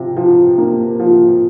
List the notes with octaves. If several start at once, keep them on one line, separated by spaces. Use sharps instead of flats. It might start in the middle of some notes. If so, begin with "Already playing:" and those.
Already playing: C3 F3
F3
A#3
F3